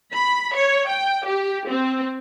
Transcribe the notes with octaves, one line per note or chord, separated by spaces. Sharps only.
B5
C#5
G5
G4
C4